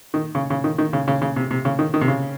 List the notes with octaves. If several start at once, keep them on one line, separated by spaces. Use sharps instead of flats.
D#3
C#3
C#3
D#3
D#3
C#3
C#3
C#3
C3
C3
C#3
D#3
D#3
C3
C#3